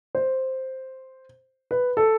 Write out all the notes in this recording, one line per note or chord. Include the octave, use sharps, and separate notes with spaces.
C5
B4
A4